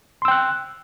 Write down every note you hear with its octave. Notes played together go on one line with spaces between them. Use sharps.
G5 C6 E6 F#6